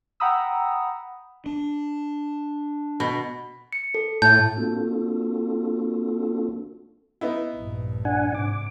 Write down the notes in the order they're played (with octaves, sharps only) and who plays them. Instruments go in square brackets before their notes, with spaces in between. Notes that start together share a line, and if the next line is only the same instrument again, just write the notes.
[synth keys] F#5 G5 A#5 B5 D#6 E6
[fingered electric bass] D4
[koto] B2
[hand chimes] C#7
A4
[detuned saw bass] A2 [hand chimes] A5 [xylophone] G6
[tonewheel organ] A#3 C4 D4 F4 F#4 A4
[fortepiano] B3 D#4 E4
[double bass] A#1 G2
[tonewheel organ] D4 F#5 G#5
[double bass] G#2 C3 [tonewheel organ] D6